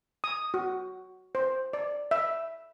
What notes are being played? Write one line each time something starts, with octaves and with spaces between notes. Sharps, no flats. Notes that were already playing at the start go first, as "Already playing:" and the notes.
D#6
F#4
C5
D5
E5